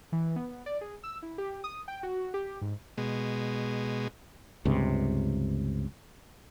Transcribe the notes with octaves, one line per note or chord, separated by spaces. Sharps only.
E3
B3
D5
G#4
E6
E4
G4
D#6
G5
F#4
G4
G#2
B2 G#3
C#2 G2 C3